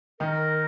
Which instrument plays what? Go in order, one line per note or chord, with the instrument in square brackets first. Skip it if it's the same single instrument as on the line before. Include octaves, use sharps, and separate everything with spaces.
[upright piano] D#3 D#4 [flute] A#4